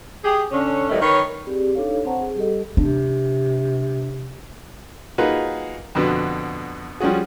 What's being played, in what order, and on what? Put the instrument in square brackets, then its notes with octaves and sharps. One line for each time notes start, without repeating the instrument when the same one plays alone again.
[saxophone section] G4 G#4
D3 C#4
A2 D#3 F3 G3 A3
D#3 B4 C#5
[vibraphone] C4 G4 G#4 D5
D4 D#4 A4 C#5 F5
C4 C5 F#5 A5 A#5 C#6
G#4
G3 G4 A4 D#5
[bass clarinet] C3 [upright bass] D4
[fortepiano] A#3 D#4 F4 F#4 G#4 B4
F2 B2 D3 B4
F3 G3 C#4 F#4 G#4